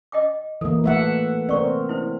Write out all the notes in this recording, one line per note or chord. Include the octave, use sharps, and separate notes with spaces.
D#5 G5 D6
E3 A#3 A4
A3 E5 F#5
C4 A#4 D5 C#6
E4 C5